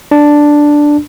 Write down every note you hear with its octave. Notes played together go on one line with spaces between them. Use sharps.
D4